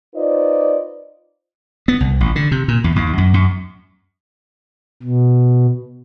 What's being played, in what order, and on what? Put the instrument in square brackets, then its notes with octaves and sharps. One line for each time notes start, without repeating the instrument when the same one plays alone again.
[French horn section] D#4 F4 B4 C5 D5 D#5
[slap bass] B3
C2
A1
D3
C3
A#2
E2
D#2
F#2
F#2
[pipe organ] B2